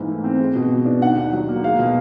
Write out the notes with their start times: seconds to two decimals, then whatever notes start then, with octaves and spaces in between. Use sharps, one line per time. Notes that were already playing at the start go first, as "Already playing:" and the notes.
Already playing: G#2 E3 A#3
0.08 A3
0.24 C4
0.40 G#3
0.55 B2
0.71 B3
0.85 D4
1.02 D#3 F#5
1.16 D#2
1.33 F#3
1.49 A#3
1.64 G#3 F5
1.79 B2